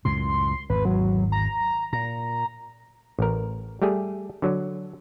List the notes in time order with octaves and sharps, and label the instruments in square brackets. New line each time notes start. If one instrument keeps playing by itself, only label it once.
[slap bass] C#2 F#2 A2 [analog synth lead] C6
[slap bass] G#1 E2 [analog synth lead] B4
[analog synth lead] F#3
A#5
[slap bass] A#2 [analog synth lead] A#5
[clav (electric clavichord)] A1 A#4
G3 A3 G4 G#4
D3 F#3